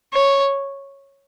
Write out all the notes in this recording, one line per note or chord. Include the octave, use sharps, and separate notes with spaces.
C#5